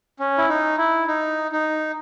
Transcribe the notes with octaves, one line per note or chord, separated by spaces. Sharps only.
C#4
E4
D#4
E4
D#4
D#4